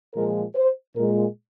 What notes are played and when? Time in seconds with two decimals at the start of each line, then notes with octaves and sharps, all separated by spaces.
0.14 A#2 F3 G#3 A#4
0.55 C5
0.96 A#2 G#3 A#4